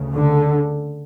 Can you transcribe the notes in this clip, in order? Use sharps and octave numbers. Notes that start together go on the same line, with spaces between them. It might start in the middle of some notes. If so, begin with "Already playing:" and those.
Already playing: D2 C#3
D3